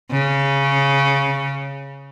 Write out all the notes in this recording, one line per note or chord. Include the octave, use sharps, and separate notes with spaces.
C#3